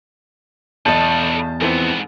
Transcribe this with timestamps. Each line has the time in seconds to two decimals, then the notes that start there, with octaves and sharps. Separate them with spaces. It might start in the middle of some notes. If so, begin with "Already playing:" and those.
0.86 B1 E2 A4 B4 D#5 A5 G6
1.61 F2 G#2 E3 B3 C4